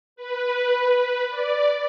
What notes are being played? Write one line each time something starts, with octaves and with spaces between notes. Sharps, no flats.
B4
B4
D5